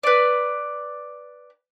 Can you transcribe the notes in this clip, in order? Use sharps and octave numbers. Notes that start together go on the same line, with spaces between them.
B4 D5